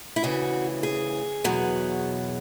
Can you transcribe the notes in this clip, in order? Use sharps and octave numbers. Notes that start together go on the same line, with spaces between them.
E4
D2 C#3 E3 F#4
G#4
E2 B2 F#3